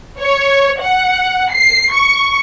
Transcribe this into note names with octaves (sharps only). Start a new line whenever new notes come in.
C#5
F#5
C7
C#6